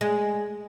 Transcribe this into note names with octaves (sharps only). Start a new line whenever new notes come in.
G#3